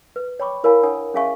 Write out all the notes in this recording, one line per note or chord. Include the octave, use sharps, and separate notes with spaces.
B4
C#5 G5 B5 C#6 D6
E4 A#4 C#5 F5 G#5 B5
D4 C#5 F#5 G#5 D#6
C#4 G#4 E5 F5 G#5 C#6